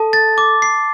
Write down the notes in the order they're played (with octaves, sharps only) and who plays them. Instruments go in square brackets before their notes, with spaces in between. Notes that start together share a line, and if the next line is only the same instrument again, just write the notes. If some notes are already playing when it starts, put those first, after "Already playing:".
Already playing: [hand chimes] A4 [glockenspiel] A5
[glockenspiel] A6
D6
C7